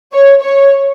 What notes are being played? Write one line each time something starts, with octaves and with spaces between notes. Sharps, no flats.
C#5
C#5